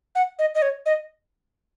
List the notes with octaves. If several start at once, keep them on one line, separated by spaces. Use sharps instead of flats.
F#5
D#5
D#5
C#5
D#5